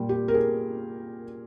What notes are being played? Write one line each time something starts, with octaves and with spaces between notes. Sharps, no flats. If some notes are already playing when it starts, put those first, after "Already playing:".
Already playing: A#2 G3
G4
A#4
G#4